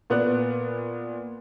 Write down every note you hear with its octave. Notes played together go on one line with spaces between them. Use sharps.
A#2 B3 D5 F#6